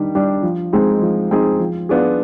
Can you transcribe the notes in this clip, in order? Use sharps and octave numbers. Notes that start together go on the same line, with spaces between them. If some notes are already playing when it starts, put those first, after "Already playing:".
Already playing: D#3 G3 D4
G3 D4
F3
G#3 C4 D#4 G#4
F3
G#3 C4 D#4 G#4
F3
B3 D4 F4 G#4